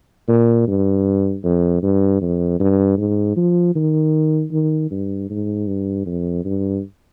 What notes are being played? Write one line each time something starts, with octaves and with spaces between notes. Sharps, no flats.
A#2
G2
F2
G2
F2
G2
G#2
F3
D#3
D#3
G2
G#2
G2
F2
G2